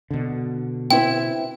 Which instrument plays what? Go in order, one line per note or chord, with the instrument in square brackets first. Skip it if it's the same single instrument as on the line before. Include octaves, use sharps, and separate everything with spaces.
[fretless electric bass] B2 D3
[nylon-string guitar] C4 E4 B4 [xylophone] G5